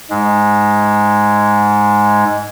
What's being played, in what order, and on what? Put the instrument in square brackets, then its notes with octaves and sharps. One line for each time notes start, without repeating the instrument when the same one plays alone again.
[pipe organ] G#2 G#3